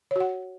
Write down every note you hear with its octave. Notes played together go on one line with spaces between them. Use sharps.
F#4 C#5 F#5